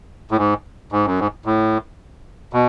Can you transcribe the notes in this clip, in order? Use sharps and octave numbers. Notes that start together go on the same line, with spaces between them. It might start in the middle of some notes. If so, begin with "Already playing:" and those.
A2
G#2
G#2
F#2
G#2
A2
B2